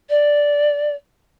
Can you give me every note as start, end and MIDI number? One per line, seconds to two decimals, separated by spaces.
0.09 0.95 74